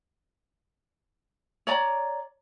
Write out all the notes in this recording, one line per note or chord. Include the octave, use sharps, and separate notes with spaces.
C#5 D5 A#5